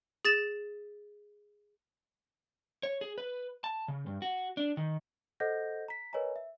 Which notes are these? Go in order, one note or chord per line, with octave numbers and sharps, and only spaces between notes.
G#4 A6 E7
C#5
G#4
B4
A5
C#3
G2
F#4
D4
D#3
A4 C5 D#5 F#5 G6 A#6
A#5 B6
A#4 B4 C#5 D#5 G#5 A#5
E5